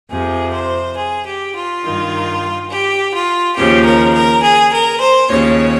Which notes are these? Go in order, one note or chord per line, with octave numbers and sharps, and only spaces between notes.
F2 C3 F3 G#4
C5
G#4
G4
F4
G2 D#3
G4
F4
D#2 C#3 F3 G4
A#4
A#4
G#4
A#4
C5
D#2 C#3 F3 C#5